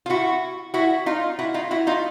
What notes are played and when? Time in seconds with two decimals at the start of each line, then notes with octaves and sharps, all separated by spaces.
0.06 F4
0.10 E4 F#4
0.74 E4 F#4
1.06 D#4 F4
1.39 E4 F#4
1.54 D#4 F4
1.71 E4 F#4
1.87 D#4 F4